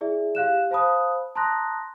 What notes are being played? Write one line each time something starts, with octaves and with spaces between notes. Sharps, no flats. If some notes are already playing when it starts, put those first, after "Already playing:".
E4 G#4 D5 E5
G4 F5 F#6 E7
C5 F5 A5 B5 D#6 F#6
A5 A#5 C6 D#6 F#6 A#6